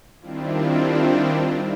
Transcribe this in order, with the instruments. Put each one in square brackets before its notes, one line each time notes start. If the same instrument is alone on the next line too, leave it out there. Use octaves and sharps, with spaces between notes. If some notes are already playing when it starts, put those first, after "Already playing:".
[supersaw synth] D#3 G3 C4 D4 E4 F4